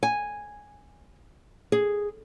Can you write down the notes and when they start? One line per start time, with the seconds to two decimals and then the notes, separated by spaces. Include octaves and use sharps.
0.03 G#5
1.72 G#4